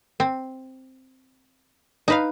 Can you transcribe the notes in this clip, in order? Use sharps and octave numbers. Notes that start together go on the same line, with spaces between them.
C4
D#4 B4 F5